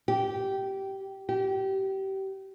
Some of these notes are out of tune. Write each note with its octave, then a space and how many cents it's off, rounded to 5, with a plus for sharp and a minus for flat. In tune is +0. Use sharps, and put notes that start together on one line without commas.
G4 -15
G4 -25